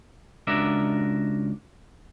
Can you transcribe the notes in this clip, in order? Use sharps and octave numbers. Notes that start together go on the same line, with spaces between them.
C#2 D4 F#4 A#4 E5